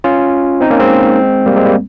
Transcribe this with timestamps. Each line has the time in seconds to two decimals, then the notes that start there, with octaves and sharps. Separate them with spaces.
0.04 C#4 F4
0.61 C4 D#4
0.70 A#3 C#4
0.80 G#3 C4
1.46 G3 A#3
1.56 G#3 C4
1.65 G3 A#3